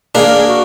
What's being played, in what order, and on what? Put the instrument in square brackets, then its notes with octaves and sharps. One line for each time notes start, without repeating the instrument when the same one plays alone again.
[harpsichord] A#3 D4 [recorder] G#4
[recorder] A#4
G#4
F#4